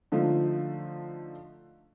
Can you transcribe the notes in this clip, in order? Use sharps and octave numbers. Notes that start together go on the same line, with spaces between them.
D3 F3 A3 D#4 F4